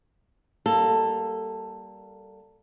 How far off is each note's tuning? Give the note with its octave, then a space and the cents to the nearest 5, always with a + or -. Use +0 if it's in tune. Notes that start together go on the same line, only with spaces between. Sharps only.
G3 -10 A#3 +0 A4 +10